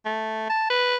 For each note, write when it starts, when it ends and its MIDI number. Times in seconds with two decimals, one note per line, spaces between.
0.05 0.48 57
0.50 0.66 81
0.70 0.96 71